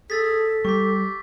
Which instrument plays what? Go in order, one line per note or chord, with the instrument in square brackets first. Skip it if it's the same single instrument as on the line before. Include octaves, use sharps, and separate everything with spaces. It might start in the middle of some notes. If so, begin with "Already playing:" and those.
[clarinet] G#4 [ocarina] A4 [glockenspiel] E6 A6 B6
[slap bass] G3 [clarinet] G4 [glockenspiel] C#6 B6